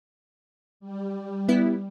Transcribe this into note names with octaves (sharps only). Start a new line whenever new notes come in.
G3
B3 E4